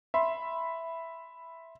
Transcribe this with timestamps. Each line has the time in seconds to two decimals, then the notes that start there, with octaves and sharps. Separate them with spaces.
0.14 E5 B5 C6